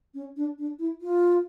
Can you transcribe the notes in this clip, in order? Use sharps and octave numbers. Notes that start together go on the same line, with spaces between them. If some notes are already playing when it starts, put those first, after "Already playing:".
C#4
D4
D4
E4
F4